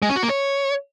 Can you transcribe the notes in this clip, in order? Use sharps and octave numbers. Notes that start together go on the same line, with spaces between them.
G#3
C#4
F#4
A#3
C#5